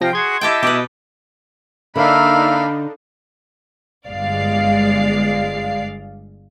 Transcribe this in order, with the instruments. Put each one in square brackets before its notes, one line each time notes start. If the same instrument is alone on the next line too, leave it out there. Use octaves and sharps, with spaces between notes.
[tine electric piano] C3 F3 A#6 [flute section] F4 F5 G5
[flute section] F#4 G#4 [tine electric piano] C6 G#6
[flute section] E4 D#5 [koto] G4 A4 G5
[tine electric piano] B2 D6 D#6 [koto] G4 B4
[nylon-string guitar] D3 [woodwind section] A#3 E5 [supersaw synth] D4 D#4 [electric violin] F5 B5
[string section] G1 G#3 D5 F5 C7